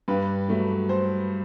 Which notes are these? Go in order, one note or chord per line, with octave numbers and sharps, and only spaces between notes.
G2 G4 B4
F#3 A3
A4 C5